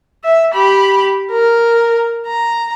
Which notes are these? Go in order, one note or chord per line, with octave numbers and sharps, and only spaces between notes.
E5
G4 B5
A#4
A#5